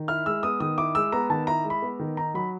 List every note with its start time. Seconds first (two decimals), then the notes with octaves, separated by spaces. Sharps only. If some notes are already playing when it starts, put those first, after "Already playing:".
Already playing: D#3
0.08 E4 F6
0.26 G#3 E6
0.43 B3 D#6
0.60 D#3 D#6
0.78 E4 D6
0.95 G#3 E6
1.12 B3 A#5
1.30 D#3 A5
1.47 E4 A#5
1.64 G#3
1.70 B5
1.82 B3
1.99 D#3
2.17 D#4 A#5
2.34 F#3 B5